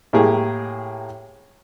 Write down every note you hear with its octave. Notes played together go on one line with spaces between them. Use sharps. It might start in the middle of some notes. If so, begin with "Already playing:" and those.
A2 A#3 G4 G#4